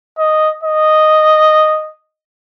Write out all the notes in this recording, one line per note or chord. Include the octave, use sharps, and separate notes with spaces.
D#5
D#5